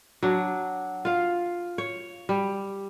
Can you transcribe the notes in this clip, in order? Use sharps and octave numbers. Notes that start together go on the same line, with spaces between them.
F#3 D4
F4 F5
C#5
G3